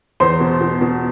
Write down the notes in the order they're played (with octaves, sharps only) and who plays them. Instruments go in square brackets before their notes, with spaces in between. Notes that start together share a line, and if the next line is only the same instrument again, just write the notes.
[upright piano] E2 C5 C6
B2
B2
B2